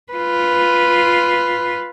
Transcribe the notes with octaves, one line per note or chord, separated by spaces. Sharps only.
F4 B4